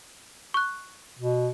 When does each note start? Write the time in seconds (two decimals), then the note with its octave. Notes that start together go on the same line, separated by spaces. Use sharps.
0.54 C#6 F#6
1.19 B2